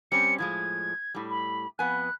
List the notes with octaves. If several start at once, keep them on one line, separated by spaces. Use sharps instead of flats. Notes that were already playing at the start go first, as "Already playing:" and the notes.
G3 C4 C#4 C#7
A2 F3 G#3 G#6
A2 G3
B5
F2 B3 G#5 F#6